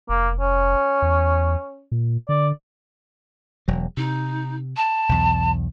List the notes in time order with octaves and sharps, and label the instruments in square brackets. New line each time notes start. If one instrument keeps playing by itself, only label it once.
[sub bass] F1 [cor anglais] A#3
[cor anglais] C#4
[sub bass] E2
A#2
[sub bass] D3 [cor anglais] D5
[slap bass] E1 F#3
[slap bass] C3 [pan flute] D#4
[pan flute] A5
[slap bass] B1 E2